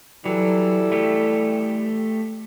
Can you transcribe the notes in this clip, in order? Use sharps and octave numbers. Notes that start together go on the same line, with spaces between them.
E3 F#3 G3 A4
A3 G4